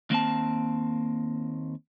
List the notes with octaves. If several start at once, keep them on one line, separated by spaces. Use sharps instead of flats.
D#2 A#3 C4 A5